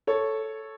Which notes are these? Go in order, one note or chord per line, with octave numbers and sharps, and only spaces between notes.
A4 C#5